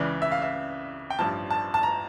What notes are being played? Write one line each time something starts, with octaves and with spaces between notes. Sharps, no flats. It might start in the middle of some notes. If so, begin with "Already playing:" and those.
Already playing: C#2 C#3 E3 D5
E5
F5
E5
G5
A1 G2 F3 A5
A5
A5
A#5